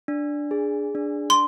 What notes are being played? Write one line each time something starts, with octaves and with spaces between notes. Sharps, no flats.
D4
G#4
D4
C6